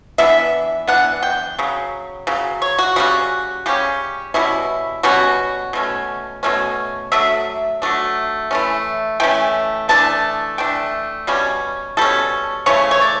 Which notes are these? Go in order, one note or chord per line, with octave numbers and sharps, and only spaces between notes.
E3 B3 D4 E5
E3 B3 D4 F#5
G5
C#3 F#3
C#3 F#3
C#5
F#4
C#3 G3 C#4 F#4
C#3 G3 C#4 G4
B2 G3 C#4 E4
B2 G3 C#4 F#4
B2 A3 C#4
B2 A3 C#4
F#3 A3 D4 E5
F#3 A3 D4
E3 A3 C#4
E3 A3 C#4 G5
E3 A3 D4 A5
E3 A3 D4 G5
B2 G3 C#4
B2 G3 C#4 A4
C#3 E3 A3 C#5
C#5
D5